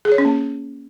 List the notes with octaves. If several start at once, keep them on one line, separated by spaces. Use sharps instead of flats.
G#4
C#5
C#4
A#3